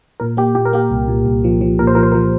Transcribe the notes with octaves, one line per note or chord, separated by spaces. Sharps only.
A#2 A#4
A#3 G4
A#2 G4
A#4
A#3 G4
C2
A#2
C2
F3
F3
A#2 A#4
C5
F3 A#4
C5
A#4
F3